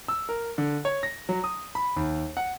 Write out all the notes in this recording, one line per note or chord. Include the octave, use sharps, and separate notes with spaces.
E6
A#4
D3
C#5
A#6
F#3
D#6
B5
D#2
F#5